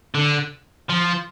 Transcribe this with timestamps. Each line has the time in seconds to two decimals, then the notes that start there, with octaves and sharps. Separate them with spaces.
0.15 D3
0.90 F3